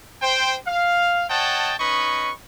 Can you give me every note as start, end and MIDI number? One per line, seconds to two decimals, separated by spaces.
0.22 0.55 72
0.22 0.55 79
0.66 1.24 77
1.29 1.73 73
1.29 1.73 75
1.29 1.73 78
1.29 1.73 79
1.29 1.73 81
1.79 2.31 61
1.79 2.31 63
1.79 2.31 71
1.79 2.31 75
1.79 2.31 83
1.79 2.31 85